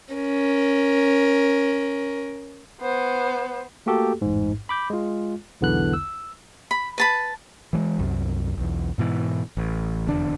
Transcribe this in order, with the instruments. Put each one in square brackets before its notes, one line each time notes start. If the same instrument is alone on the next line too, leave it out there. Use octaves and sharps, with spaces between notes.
[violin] C#4 A#4
[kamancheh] B3 C5
[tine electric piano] A3 A#3 F#4 G4 A4
A1 F2 G#2
B5 D6 G6
G#3 F4
B1 E2 D3 B3 E4 F#6
E6
[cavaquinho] B5
B4 A5 B5
[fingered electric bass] E3 G3 G#3
C2 F#2
B1 E2
G#2 B2 E3
A1
F1 E2 D3 D4